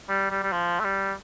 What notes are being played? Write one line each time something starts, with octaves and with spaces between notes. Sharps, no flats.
G3
G3
G3
F3
A3
G3